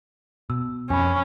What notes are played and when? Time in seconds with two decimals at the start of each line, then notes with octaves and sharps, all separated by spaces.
0.50 B2 E6
0.90 F2 C#4 G#5 B5